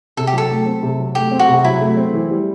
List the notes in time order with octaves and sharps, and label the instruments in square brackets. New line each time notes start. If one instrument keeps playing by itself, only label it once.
[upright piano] C3 [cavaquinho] A4
[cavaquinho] G4
[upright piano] F#3 [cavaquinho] A4
[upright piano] A3
C4
C3
F#3
[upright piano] A3 [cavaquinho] G4
[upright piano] C4
[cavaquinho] F#4
[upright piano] C3
[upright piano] F#3 [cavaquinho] E4
[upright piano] A3
C4
E3
G3